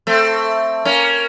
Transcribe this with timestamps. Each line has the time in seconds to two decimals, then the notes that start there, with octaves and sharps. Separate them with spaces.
0.07 A3 C4
0.85 A#3 C#4